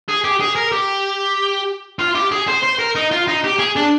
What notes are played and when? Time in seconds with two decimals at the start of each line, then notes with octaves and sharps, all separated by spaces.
0.08 G#4
0.24 G4
0.40 G#4
0.56 A#4
0.72 G4
1.99 F4
2.15 G4
2.32 G#4
2.48 C5
2.63 C5
2.79 A#4
2.95 D#4
3.11 F4
3.28 D#4
3.44 G4
3.59 G#4
3.76 D4